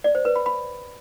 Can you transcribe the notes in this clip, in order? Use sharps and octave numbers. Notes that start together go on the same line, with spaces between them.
D5
C5
B4
B5
B5